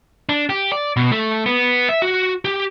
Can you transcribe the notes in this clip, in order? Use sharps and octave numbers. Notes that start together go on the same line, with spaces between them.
D4
G4
D5
B2
A3
B3
E5
F#4
G4